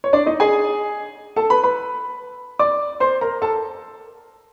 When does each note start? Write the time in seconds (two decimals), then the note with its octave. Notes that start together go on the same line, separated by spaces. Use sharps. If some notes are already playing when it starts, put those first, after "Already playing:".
0.04 C#5
0.13 D4 D5
0.26 D#4 D#5
0.40 G#4 G#5
1.36 A4 A5
1.50 B4 B5
1.63 B4 B5
2.59 D5 D6
3.00 C5 C6
3.21 A#4 A#5
3.42 A4 A5